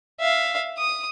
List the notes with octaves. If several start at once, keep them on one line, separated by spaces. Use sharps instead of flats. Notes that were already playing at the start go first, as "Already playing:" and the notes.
E5 F5
D#6